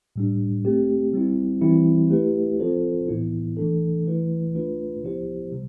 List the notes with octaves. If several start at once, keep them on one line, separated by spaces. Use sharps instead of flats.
A2 G3 D4
A3 C4 G4
G3 C4 E4
E3 G3 C4 E4
A3 E4 G4 B4
F3 C4 F4 A4 C5
A2 E3 B3 E4
E3 A3 D4 A4
E3 A3 E4 B4
A3 D4 F4 B4
F3 B3 E4 G4 C5
C3 G3